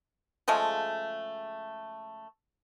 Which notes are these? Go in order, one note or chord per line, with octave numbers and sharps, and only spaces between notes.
C#3 F3 G#3 A3